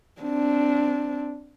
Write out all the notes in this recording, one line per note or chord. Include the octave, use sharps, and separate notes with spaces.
C4 D4